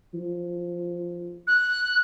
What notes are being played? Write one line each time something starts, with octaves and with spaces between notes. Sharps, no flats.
F3
F#6